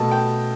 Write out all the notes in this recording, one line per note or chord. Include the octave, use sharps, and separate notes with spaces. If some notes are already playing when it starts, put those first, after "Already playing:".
Already playing: B2 A3 A5
G5